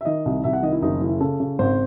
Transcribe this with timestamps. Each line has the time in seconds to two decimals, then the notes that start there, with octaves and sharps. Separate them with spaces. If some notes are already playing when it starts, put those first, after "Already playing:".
0.01 E5
0.05 D#3 D#5
0.26 C2
0.44 C2 E5
0.53 F#5
0.63 D#3 D#5
0.72 E4
0.82 F#1 D#4
1.01 C#3 E4
1.20 C#3 A4
1.40 C#3
1.59 G#1 C5